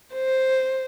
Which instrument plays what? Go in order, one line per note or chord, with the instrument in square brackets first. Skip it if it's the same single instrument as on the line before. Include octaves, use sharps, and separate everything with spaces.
[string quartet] C5